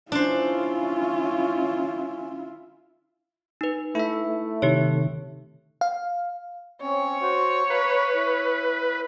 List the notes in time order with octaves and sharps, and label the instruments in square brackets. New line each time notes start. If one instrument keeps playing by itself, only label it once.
[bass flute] C#4 [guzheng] D4 C5 [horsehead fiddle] E4 F4
[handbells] D#4 B4
[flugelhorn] A3 [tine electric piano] E4 E5
[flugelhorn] A3
[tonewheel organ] C3 D#3 [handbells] G4 C#5
[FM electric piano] F5
[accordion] C4 C#4 [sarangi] C#5
[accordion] F#4 C5 F#5
[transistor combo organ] B4 [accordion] F5 A#5 B5
[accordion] E4